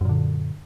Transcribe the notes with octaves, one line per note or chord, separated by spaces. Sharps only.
F#2 A#2 D3